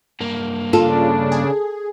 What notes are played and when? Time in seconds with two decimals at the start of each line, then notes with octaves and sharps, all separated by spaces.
0.20 G2 A#3
0.73 C#3 D4 F4 A4
1.32 G#4